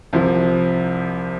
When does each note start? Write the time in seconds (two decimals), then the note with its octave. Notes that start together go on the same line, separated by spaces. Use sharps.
0.13 C2 C3 F3